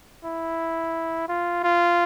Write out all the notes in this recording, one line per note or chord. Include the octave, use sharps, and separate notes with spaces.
E4
F4
F4